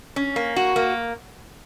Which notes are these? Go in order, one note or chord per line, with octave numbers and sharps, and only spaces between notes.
C#4
A#3
F#4
A#3